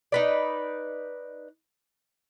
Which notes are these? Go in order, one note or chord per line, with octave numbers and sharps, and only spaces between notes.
D#4 B4 D5